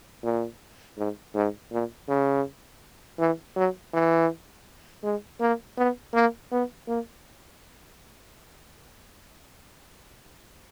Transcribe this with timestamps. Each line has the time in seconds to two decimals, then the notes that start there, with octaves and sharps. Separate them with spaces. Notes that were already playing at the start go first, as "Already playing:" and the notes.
0.24 A#2
0.98 G#2
1.35 G#2
1.72 A#2
2.08 C#3
3.19 E3
3.56 F#3
3.94 E3
5.04 G#3
5.41 A#3
5.78 B3
6.14 A#3
6.52 B3
6.88 A#3